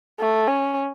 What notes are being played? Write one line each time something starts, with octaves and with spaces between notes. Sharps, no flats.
A3
C#4